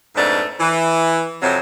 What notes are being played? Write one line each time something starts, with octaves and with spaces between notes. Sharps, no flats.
F2 G#2 A3 B3 D4
E3
F2 C3 F#3